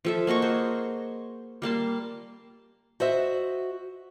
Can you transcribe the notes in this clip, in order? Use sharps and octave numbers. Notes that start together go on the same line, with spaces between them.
F3 A4 E5
A#3 F#4 D#5 C#6
G#4 C5
G3 A#3 A5 C6
F#4 C5 D#5 E5